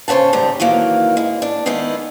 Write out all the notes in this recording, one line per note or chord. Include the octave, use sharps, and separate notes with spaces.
C#3 C5 C#5 F#5 A5
D#2 G#2 G3 A#5
D#3 E3 F#3 A#3
G#3
D4
D#3 G#3 B3 D#4 E4